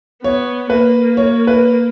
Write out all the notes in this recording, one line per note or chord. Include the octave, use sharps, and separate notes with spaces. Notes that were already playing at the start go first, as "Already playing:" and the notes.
B3 C#5
A#3 B4
C#5
B4